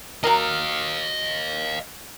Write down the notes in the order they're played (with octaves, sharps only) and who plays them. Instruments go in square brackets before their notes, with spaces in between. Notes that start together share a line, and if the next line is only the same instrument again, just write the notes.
[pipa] F#3 A#4 [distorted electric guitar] D#5 F5